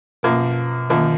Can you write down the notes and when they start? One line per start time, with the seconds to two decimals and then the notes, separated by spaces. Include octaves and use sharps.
0.23 F#2 B2 F3 A#3
0.90 F#2 D#3 F3 A#3